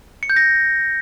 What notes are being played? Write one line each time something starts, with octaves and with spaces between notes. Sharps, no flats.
C#7
G6
A#6